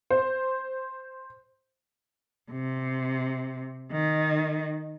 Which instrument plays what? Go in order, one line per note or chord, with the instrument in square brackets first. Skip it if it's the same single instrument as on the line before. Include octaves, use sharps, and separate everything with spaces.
[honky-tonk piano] C5
[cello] C3
D#3